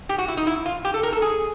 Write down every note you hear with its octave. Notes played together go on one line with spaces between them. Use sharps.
G4
F#4
E4
D#4
E4
F4
G4
A4
A#4
A4
G#4